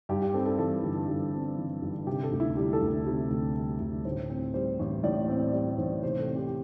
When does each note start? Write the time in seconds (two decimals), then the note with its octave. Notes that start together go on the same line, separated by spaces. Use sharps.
0.09 G2 G4
0.22 G4
0.34 C4 A4
0.46 A4
0.59 E3 A4
0.84 G1
1.08 G2
1.33 C4
1.58 E3
1.82 G1
2.07 C3 G4
2.23 A4
2.32 D2
2.40 E4
2.57 G3 G4
2.73 A4
2.81 D2
3.06 C3
3.31 D2
3.55 G3
3.80 D2
4.05 A2 C5
4.30 C4
4.54 G3 C5
4.79 A1
5.03 A2 D5
5.28 C4
5.53 G3 D5
5.78 A1 C5
6.02 C3 C5
6.20 A4
6.27 C4
6.36 G4
6.47 G4